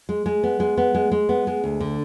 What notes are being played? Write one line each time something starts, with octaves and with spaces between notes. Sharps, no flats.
G#3
G#3
B3
G#3
B3
G#3
G#3
B3
G#3
D2
D3